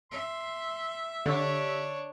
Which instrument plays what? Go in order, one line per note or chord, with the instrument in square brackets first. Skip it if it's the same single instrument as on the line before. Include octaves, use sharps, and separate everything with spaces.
[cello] E5 [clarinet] C6
[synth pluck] D3 [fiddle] D4 C#5 [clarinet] G4